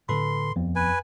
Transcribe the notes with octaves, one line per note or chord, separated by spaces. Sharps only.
A2 D3 A4 B4 B5 C6
D#1 F2 F3 B3
B4 G#5